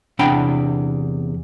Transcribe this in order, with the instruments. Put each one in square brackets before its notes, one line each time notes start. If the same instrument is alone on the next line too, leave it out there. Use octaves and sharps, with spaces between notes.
[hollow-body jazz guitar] E2 C3 D4 F#5 G5 B5